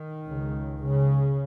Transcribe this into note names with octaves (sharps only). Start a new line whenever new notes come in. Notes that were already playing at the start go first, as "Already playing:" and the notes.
Already playing: D#3
C#2 C#3
C#3